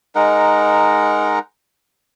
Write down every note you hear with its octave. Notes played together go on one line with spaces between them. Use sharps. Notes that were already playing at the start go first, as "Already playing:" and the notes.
G#3 D#4 A#4 F#5